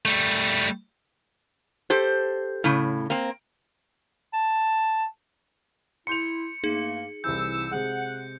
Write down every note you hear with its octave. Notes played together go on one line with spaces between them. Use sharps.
G3 A3
G4 A4 C5
A2 C#3
A#3 C4
A5
E4 C6 G6 C#7 F7
G2 A3 A#3 D#4 G#4
C2 C3 E3 E6 G6
C3 G#3 F#5